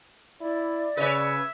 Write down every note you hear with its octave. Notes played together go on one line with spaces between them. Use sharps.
E4 D5
C#3 B4 C#5 E5